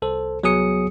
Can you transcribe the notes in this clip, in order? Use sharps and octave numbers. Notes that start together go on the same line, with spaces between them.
C2 A4 C5
C2 F#3 B3 G#4 D#6 C#7